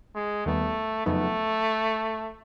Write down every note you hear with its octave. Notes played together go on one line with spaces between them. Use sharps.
G#3
D#2 D#3 G3 A3 B3
F2 C#3 F#3 A3 B3 D#4